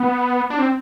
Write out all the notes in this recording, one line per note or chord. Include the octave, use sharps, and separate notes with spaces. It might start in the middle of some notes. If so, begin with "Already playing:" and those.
Already playing: B3
D4
C4